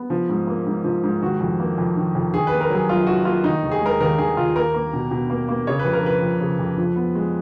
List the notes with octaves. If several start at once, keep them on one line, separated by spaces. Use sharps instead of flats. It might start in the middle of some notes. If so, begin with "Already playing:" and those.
Already playing: B3
F3
G#2
A#3
G#2
F3
G#2
D#3 F#4
F2
A#3
F2
D#3
F2
D#3 G#4
B4
A#3
A#4
F#3 G#4
F#2 F4
D#3 F#4
A#3 F4
D#3 D#4
D#2
G#4
G#3 A#4
D#2 A#4
D#3 G#4
D#2 F4
A#3 A#4
A#3
B2
B2
A#3
A#3
C#3 C#5
B4
F2
A#4
F3 B4
F2
C#3
F2
F3
B3
G#3